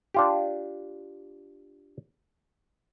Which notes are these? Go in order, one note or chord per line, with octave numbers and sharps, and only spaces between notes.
D4 F4 G4